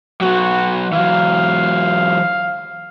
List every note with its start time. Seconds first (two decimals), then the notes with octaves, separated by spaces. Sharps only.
0.21 F#3 B3 F#4
0.92 E3 F#3 F5